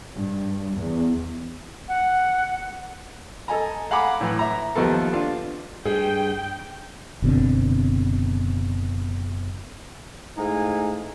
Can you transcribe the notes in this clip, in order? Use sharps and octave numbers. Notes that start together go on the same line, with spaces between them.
G2
E2
F#5
A4 D#5 G#5 A#5
F5 F#5 G#5 A#5 B5 D6
A2 E3
E5 A#5
D#2 F3 B3 A4
D4 F4 F5
G2 G#4 G5
F#1 B2 D3 C4
G#2 A3 D#4 E4 F5 G#5